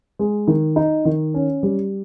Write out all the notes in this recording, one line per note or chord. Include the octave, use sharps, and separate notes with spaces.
G#3
D#3
D#4
D#3
C#4
G3